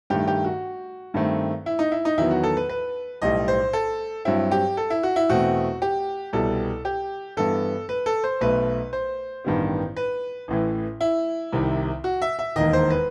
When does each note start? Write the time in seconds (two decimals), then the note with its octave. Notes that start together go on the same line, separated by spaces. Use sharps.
0.10 G2 D#3 A3 G4
0.27 G4
0.45 F#4
1.14 G2 D#3 A3 C4
1.66 E4
1.79 D#4
1.92 E4
2.05 D#4
2.18 E2 D#3 F#3 B3 E4
2.31 F#4
2.43 A4
2.57 B4
2.69 B4
3.22 B1 A2 G3 D#5
3.48 C5
3.73 A4
4.25 G2 F#3 C4 E4
4.51 G4
4.77 A4
4.90 E4
5.03 F#4
5.16 E4
5.29 E2 B2 A3 C4 F#4
5.82 G4
6.33 C2 B2 G3 A4
6.85 G4
7.37 G2 E3 B3 A4
7.89 B4
8.06 A4
8.24 C5
8.41 B1 B2 A3 B4
8.93 C5
9.44 A1 G2 D#3 G3 B3
9.96 B4
10.48 A1 A2 E3
11.01 E4
11.52 C2 C3 D#3
12.04 F#4
12.22 E5
12.39 E5
12.56 E1 D#2 D#3 D#5
12.73 C5
12.90 B4